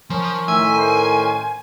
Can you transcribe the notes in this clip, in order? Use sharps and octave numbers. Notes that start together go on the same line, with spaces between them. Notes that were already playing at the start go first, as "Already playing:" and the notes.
F3 C#4 A#4 C6
A2 D#3 E5 G#5
C5